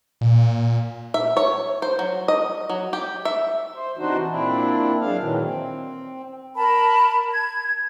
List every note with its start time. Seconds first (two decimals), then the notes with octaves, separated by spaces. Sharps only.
0.21 A#2
1.14 E5
1.37 C#5
1.82 C5
1.99 F#3
2.28 D#5
2.70 F#3
2.93 G4
3.25 E5
3.74 C5
3.98 C3 E3 D4 D#4 F#4 C5
4.28 A#2 C4 D4 E4
5.01 F#2 G#3 D4 F5
5.19 A#2 D#3 E3 F#3
5.41 C4
6.56 A#4 A5 B5
7.31 G#6